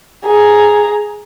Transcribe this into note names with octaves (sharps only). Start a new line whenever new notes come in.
G#4 A#5